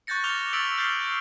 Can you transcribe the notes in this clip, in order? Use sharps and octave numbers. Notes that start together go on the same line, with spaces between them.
C#6 F#6 G6 A6 A#6 C#7
D6 F6 G6 A#6 F7 G7
C#6 E6 A6 B6 D7 F#7
F6 G6 A6 C7 G7